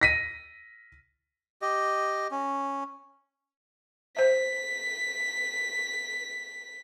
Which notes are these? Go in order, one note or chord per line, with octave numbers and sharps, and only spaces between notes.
A#6 B6 D#7
G4 D#5
C#4
C5 E5 B6